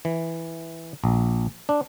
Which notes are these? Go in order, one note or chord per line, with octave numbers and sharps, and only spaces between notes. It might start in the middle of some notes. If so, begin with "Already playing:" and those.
E3
A#1
D4